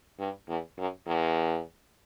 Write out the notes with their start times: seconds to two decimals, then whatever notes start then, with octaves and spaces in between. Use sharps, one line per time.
0.19 G2
0.49 E2
0.78 F#2
1.07 E2